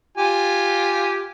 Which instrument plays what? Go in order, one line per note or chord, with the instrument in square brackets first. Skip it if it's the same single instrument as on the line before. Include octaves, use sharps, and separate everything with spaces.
[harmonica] F4 G4 G#5